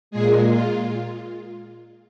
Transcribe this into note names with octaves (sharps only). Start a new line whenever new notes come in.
A#2 G#3 G#4
F4